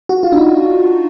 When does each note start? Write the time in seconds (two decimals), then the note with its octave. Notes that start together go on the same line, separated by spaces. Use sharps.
0.09 F#4
0.23 F4
0.32 D4
0.37 D#4